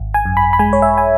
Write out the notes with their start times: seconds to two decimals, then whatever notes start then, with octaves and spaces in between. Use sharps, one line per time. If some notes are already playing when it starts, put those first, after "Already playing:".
Already playing: G#1
0.14 G#5
0.25 F#2
0.37 B5
0.53 B5
0.59 G#3 G#5
0.73 C#5
0.82 E5
0.98 G#5